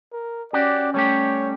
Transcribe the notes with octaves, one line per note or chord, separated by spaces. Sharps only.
A#4
C#4 F#4 G4 D5
G3 A3 G4 C#5